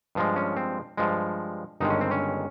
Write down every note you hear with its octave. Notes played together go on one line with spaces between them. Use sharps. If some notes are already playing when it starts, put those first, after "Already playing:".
G2 F3 G#3
C#4
C4
G2 F3 G#3
G1 G2 D#3 G#3 D#4
C#4
C4
C#4